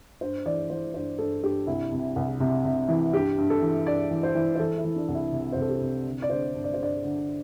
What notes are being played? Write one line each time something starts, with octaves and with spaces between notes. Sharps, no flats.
G2 C5
E3 D5
E3 C5
G2 C5
G2 A4
G2 G4
C2 E4
C3
C2
C3
C3
E3
G2 G4
G2
A4
E3
G2 D5
E3
C5
E3
C5
E3 A4
E4
E3
D4
C2
E4
C3
C5
C2 A4
G4
C3
D3
D5
D3 C5
G2
D5
C5
G2 D5
D3